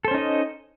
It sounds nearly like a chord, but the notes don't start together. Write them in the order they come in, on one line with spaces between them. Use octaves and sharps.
A4 C5 C#4 D#4 D#5